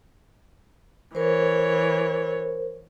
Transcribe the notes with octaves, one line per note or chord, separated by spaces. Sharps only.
E3 A#4 C5 C#5